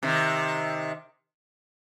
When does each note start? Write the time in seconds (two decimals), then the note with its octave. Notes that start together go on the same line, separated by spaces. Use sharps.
0.03 C3 D#3